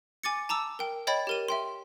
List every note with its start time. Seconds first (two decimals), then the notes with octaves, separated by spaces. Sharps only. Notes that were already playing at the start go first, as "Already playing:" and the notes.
0.23 G#5 D6 A6 C#7
0.49 A5 A#5 D6 E6
0.79 A#4 G5
1.07 C#5 D#5 G5 B5 A6
1.27 G4 A#4 D#7
1.48 E5 G5 C6